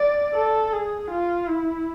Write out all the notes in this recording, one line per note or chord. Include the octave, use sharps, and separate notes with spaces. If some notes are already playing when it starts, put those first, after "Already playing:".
Already playing: D5
A4
G#4
F4
E4